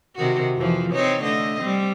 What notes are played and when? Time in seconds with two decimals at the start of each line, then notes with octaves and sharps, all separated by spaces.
0.16 C3 D#3 F#4
0.56 F2 E3 F3
0.93 C4 D#4 C#5
1.23 D3 A3 D#5
1.61 G3 C4